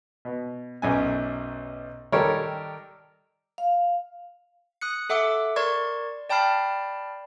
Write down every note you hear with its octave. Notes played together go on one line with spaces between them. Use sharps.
B2
B1 F#2 G#5
D#3 G3 G4 A4 A#4 C#5
F5
D#6 F#6 C#7
A4 E5 F#5 D6 E6
A#4 D5 C6 C#6 G#6
D5 G5 A5 B5 F6 C7